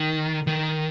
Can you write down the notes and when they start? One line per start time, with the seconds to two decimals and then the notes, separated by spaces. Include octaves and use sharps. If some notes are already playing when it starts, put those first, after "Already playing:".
Already playing: D#3
0.47 D#3